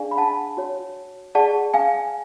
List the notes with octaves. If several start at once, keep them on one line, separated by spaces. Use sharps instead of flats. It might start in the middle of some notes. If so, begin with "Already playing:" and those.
Already playing: D4 G#4 D5 F5 G#5
B5
F#5 A5
F#4 C#5
G#4 D5 F#5 A5
F5 G#5